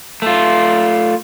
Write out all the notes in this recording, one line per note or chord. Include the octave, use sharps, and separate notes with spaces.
A3 F4